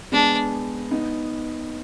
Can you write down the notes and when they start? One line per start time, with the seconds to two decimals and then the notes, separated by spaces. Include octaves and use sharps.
0.12 G#3 B3 D4
0.91 B3 D#4